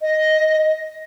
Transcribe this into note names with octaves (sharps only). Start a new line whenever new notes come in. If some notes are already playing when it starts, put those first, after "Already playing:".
D#5